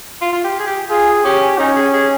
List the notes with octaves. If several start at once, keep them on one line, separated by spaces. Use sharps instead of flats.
F4
F4
G4
G#4
G4
F4 G#4
C#4 G4
C#4 D#4
G#4
G#4